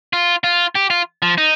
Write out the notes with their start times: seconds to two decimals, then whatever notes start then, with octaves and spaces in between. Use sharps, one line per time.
0.13 F4
0.44 F4
0.75 G4
0.90 F4
1.22 F3
1.38 D#4